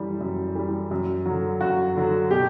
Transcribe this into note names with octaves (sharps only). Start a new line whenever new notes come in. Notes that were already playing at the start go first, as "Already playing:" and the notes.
Already playing: F#2 E3 G3
F#2
E3 G3
F#2
D3 F#3
F#2 F#4
D3 F#3
B2 G4